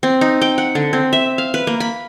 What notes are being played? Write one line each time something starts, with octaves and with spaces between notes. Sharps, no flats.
C4
D#4
G5
F#5
D3
C4
E5
F5
B4
A#3
B5